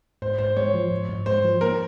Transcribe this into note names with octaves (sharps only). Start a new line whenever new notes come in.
G#2 C5
G#2 C5
G#3 C#5
F3
G#2
G#2
G#3 C5
F3
A#3 A#4